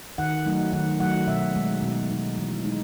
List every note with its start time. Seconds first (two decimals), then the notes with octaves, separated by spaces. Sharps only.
0.18 D#3 F#5
0.46 F#3 A3 D#4
0.73 D#3 F#5
1.00 F#3 A3 D#4 F#5
1.27 B2 E5
1.55 G#3 D#4
1.82 B2
2.10 G#3 D#4
2.38 E3
2.64 G#3 D#4